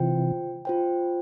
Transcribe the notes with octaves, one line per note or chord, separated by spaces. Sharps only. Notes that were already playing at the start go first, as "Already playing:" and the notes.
Already playing: C3 E3 F4 C5 G5
F4 C5 G5